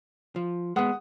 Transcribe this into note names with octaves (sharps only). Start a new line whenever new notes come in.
F3
G#3 B3 F#5 D#6